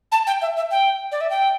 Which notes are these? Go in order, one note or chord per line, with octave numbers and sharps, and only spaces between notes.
A5
G5
E5
E5
G5
D5
E5
G5